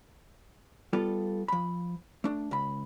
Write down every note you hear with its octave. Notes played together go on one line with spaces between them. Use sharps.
G3 B3 F4 A4
F3 B5
A3 D4
C#2 B5